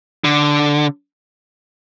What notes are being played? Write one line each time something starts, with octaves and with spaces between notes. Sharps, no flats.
D3